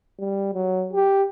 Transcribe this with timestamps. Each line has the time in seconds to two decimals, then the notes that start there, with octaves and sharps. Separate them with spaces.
0.20 G3
0.54 F#3
0.93 G4